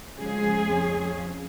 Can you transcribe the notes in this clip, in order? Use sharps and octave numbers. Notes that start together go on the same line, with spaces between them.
C#3 F3 G#3 G#4
F2 F3 C#4